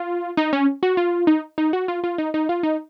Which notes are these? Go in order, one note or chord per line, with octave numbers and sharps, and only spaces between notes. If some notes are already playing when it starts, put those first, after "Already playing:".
Already playing: F4
D#4
C#4
F#4
F4
D#4
D#4
F#4
F4
F4
D#4
D#4
F4
D#4